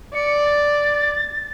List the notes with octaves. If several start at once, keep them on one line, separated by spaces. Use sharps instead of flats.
D5 C#7
A6